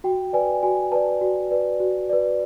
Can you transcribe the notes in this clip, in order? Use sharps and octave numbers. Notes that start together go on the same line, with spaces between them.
F#4 G5
B4 D5 G#5
F#4 G#5
B4 D5 A5
F#4
B4 D5
F#4
B4 D5